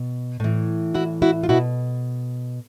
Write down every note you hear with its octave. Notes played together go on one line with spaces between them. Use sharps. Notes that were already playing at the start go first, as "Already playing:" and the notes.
Already playing: B2
A2 E3
E4 F#4
E4 F#4
F4
B2 E4 F#4